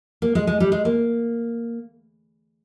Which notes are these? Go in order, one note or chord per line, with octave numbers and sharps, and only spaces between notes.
A#3
G#3
G#3
G3
G#3
A#3